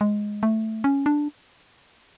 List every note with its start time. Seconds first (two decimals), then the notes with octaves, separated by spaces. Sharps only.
0.01 G#3
0.43 A3
0.84 C#4
1.06 D4